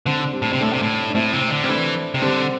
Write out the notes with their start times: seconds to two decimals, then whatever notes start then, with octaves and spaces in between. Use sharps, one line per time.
0.06 D3 C4
0.19 D4
0.33 G3 C4
0.42 A2
0.53 C3
0.60 A2 A3 D4
0.73 C3
0.83 A2
1.09 D4
1.15 A2 C4 E4
1.33 C3
1.51 D3
1.64 G3 C4
1.68 E3 A3 D4
2.14 C3
2.22 D3 G3 C4